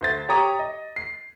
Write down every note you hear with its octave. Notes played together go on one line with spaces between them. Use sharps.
D2 C5 A6
G4 C#5 A#5 D#6
D#5
C7